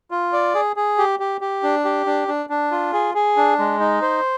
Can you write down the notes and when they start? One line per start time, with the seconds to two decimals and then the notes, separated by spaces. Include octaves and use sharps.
0.11 F4
0.33 D5
0.55 G#4
0.76 G#4
0.98 G4
1.20 G4
1.41 G4
1.63 D4
1.85 G4
2.06 D4
2.28 D4
2.50 D4
2.71 F4
2.93 G#4
3.15 G#4
3.37 D4
3.59 G#3
3.80 D#4
4.02 C5